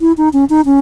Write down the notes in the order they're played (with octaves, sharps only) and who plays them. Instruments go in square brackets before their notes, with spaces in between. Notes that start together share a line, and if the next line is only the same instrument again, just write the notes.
[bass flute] E4
D#4
C#4
D#4
C#4